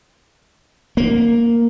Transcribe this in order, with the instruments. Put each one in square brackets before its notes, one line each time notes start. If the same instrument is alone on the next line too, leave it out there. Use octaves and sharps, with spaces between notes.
[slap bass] A#3